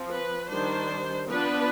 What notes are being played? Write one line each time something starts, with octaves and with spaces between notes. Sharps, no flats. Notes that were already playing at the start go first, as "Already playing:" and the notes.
Already playing: F3 C4
B4
D#3 G3 D4 C5
F3 B3 D4 B4